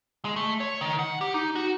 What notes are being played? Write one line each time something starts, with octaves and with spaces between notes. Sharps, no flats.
G#3
A3
C#5
D#3
F#5
G4
D#4
F#4